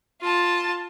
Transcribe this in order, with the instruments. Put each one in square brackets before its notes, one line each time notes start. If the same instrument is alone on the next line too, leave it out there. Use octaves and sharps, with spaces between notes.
[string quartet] F4 A5